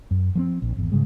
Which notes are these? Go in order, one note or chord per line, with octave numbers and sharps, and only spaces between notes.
F#2
F3 A3 C4
A#1
G#1 E2
G#2 C#3 G3 G#3